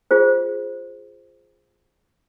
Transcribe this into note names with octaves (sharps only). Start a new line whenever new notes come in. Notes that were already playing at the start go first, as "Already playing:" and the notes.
F4 G#4 C5